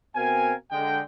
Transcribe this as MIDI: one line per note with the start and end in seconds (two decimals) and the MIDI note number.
0.16 0.53 47
0.16 0.53 60
0.16 0.53 70
0.16 0.53 77
0.16 0.53 80
0.72 1.02 50
0.72 1.02 56
0.72 1.02 79